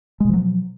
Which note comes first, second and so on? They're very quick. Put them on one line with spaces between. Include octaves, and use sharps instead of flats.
G#3 B2 F3 F#3